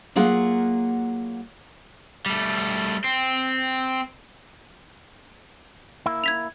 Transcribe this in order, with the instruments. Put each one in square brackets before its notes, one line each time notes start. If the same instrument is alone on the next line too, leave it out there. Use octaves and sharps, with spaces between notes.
[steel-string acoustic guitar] F#3 A#3 F4 G#4 F#5
[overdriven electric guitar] G3 A3
C4
[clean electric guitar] A#3 E4
[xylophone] G#6 B6 F7